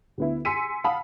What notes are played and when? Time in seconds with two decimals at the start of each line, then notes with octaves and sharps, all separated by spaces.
0.18 D2 B3 E4
0.45 G#5 C6 E6 B6 C#7 D#7
0.84 F5 F#5 A5 B5 D#6